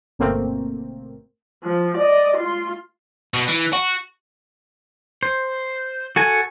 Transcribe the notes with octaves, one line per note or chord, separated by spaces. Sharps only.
G1 B2 A3 A#3 C4
F3
D5 D#5
F4 C6
B2
E3
F#4
C5
F#4 A4 G#5